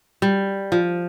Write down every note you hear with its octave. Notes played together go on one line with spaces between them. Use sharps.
G3
F3